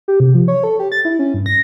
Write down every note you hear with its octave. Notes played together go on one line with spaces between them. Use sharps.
G4
C3
F3
C#5
A4
G4
A6
E4
C#4
G2
A#6